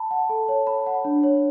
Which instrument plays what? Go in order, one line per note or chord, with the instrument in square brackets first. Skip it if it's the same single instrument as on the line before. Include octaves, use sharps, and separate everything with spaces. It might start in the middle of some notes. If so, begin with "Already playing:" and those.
Already playing: [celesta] A5 B5
F#5
A4
C#5
B5
F#5
D4
C#5